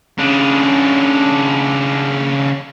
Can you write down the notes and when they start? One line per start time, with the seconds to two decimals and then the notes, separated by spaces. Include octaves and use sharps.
0.19 C#3 D4